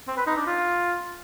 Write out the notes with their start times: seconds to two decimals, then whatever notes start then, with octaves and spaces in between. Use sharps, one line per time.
0.08 C4
0.17 B4
0.27 D#4
0.36 D4
0.46 F4